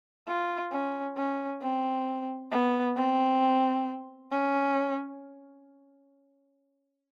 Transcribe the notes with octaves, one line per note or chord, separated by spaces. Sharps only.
F4
C#4
C#4
C4
B3
C4
C#4